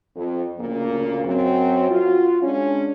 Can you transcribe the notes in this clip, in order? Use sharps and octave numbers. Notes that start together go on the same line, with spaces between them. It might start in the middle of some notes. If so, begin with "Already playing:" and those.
F2
D2 A#2 C#3 A#3
F#2 F#3 C4
F4 F#4
G#3 C#4 D4